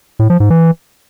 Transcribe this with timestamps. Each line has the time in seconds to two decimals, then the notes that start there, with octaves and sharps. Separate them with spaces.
0.19 A2
0.30 F3
0.40 G#2
0.50 E3